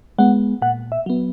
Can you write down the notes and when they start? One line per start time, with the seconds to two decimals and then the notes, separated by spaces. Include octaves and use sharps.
0.18 G#3 B3 F#5
0.62 A#2 F#5
0.92 E5
1.06 F#3 B3